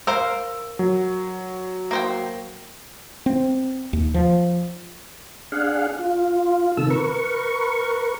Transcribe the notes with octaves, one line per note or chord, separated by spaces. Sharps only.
A#4 C5 F5 E6
F#3
A#3 C5 G5
C4
D#2
F3
D4 G#4 F5 F#5
F4
C3 D#3 A4 E6
A#4 B4 C#6